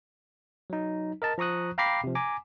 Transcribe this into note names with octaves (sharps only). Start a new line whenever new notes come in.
F#3 D#4
A#4 D#5 A5
F3 A#5 C#6 D#6 F#6
F5 G5 A#5 B5 D6 C7
C3 F3
G#5 A#5 D6